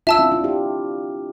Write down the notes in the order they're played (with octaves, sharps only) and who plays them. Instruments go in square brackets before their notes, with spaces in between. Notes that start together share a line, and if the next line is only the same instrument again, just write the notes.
[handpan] D4 F4 [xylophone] E5 A5 E6
[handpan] C4 E4
D4 F4
E4 G4